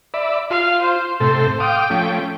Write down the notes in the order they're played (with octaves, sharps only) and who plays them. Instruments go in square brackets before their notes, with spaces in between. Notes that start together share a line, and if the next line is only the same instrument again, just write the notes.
[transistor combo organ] D5 E5 B5
[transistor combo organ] F4 [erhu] F5
[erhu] C5
[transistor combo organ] A2 C3 A4 [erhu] C5
[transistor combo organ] F5 D6 D#6 [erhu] G5
[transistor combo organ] F3 A3 C#4